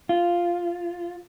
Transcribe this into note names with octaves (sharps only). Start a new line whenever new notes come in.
F4